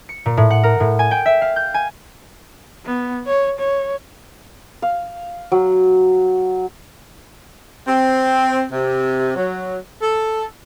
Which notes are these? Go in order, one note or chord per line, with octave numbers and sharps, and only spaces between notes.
C#7
A#2
A2
F#5
A#4
A2
G#5
G5
E5
F5
G6
G#5
B3
C#5
C#5
F5
F#3
C4
C3
F#3
A4